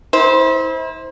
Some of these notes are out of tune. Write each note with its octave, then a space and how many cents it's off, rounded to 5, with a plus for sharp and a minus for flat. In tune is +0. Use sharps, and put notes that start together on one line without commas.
E4 -35 C5 +5